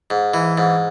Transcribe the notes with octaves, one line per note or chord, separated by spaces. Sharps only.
G#2
E3
G#2